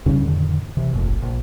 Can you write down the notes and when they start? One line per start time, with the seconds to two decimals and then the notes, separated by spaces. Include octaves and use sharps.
0.06 D#2 C#3 G3 C#4
0.22 F2 A2 D3 D#3
0.77 C3 E3
0.93 F1 A#1 A2
1.22 A#1